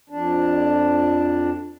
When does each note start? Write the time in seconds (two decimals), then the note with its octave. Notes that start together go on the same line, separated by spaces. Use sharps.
0.10 F2 D4